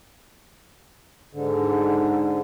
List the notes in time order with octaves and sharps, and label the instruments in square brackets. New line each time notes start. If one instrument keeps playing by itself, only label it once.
[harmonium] G#2 D3